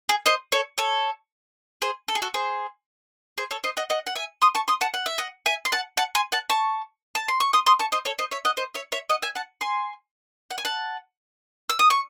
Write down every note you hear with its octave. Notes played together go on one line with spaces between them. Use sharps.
G#4
C5 D#5
A4 C#5
A4 C#5
G#4 C5
A4
G#4
F#4 A4
G#4 C5
G#4 C5
A4 C#5
C5 D#5
D#5 F#5
D#5 F#5
F#5
E5 G#5
C6 D#6
A5 C#6
C6 D#6
F#5 A5
F#5
E5
D#5 F#5
E5 G#5
C6
F#5 A5
F#5 A5
G#5 C6
F#5 A5
A5 C#6
A5
C6
C#6
C6 D#6
C6 D#6
A5 C#6
C5 D#5
A4 C#5
C5 D#5
C#5 E5
D#5 F#5
C5 D#5
C#5 E5
C#5 E5
D#5 F#5
E5 G#5
F#5 A5
G#5 C6
F#5
G#5
F#5 A5
E6
D#6
C#6